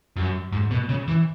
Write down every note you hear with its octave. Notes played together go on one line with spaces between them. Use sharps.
F#2
G#2
B2
C#3
E3